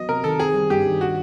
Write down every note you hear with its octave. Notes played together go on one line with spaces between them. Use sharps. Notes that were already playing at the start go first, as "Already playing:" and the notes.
Already playing: F#3 B3 D#5
C3 A#4
D#3 A4
C4 G#4
G3
G2 G4
D#3
F#4